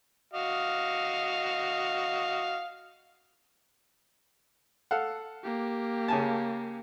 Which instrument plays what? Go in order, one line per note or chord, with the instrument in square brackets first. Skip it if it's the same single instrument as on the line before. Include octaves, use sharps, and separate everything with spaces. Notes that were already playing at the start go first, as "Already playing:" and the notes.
[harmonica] F#4 D#5 F5
[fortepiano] A4 F5 F#5
[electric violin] A#3 G4
[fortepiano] C#3 G#5 A5